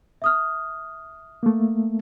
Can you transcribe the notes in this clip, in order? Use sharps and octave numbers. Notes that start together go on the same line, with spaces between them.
E5 D#6 F6
A3 A#3